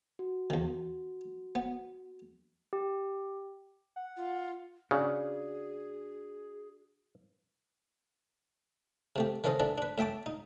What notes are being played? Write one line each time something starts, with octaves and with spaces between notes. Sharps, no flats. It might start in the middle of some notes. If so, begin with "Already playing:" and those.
F#4
E2 D#3
B3
G4
F#5
F4
C#3 D4 F#4 G#4 F#5
C3 A3 G4
D#3 E3 C#4 A4 C5 D#5
E3 D4 A4
D4 B4
A2 E5 G5 A5 D6
D#4